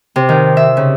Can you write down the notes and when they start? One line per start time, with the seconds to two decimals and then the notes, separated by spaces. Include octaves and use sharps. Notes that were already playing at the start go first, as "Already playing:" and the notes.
0.16 C3
0.29 D#3
0.57 E5
0.77 C#3